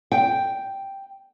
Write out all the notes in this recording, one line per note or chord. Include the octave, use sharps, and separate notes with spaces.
G5